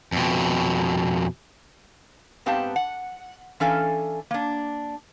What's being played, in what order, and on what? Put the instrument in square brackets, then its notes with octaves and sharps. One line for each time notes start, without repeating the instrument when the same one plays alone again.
[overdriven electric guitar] F2 B2
[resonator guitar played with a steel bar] G#2 B3 C4 G4 F5 A5
F#5
E3 C#4 D4 A4 F5 G#5
A#3 D4